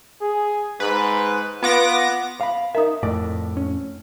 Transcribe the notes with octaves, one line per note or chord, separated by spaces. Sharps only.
G#4
G#2 B4
B3 F4 D6 A#6
F5 B5
D#4 A#4 E5 A#5 D#6
F2 A2 D5
C#4